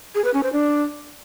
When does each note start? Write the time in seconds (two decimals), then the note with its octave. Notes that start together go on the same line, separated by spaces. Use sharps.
0.15 G#4
0.24 B4
0.34 C#4
0.43 C5
0.53 D4